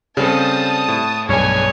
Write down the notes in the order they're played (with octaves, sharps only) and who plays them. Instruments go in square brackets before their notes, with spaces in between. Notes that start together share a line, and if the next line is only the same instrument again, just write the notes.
[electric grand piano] C#3 [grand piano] G3 C4 A4 [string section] A5 D#6
[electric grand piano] A2
[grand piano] B1 G2 [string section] G#4 G#5 [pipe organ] C#5